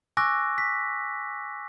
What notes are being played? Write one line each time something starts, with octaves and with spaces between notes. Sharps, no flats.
G#5 C#6 D6 E6 F#6 A#6
B6